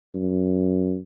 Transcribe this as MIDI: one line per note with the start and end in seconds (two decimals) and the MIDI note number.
0.15 0.98 42